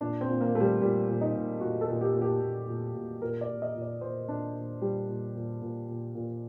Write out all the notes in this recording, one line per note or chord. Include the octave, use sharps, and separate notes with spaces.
A#2 D4
C4
A#2
A#3
A#2 A3
G3
A#2 G3
A#2
D#4
A#2
A#2 F#4
A4
A#2
G4
A#2
G4
A#2
A#2
A#2
A#2 A#4
D5
A#2
D#5
A#2
D5
A#2 C5
A#2 D4
A#2
A#2 G3
A#2
A#2
A#2
A#2
A#2